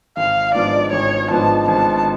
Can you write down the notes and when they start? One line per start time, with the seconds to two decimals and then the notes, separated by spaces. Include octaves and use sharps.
0.17 G#1 F5
0.55 G#2 F3 B3 D4 D5
0.92 G#1 C#5
1.30 G#2 F3 B3 D4 A5
1.68 G#1 A5